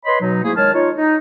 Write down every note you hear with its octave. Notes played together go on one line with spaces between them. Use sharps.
B4 C#5 D#5 B5 C6
B2 F#3 D#4
G#2 A3 A#3 E4 G#4
D#3 G#3 C#5 A5 F6
D#4 F4 C#5
D#4